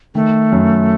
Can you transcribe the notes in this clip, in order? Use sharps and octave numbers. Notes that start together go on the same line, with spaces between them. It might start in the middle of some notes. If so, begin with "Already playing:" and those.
D#3 A3
F#2